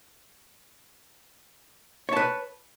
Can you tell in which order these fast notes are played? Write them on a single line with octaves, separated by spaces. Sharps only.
C#5 A5 B4